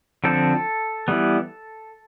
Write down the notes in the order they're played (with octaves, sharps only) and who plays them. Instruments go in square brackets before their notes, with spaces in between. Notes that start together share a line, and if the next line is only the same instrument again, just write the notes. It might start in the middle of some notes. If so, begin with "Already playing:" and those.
[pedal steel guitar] D3 F3 C4 A4
E3 G3 B3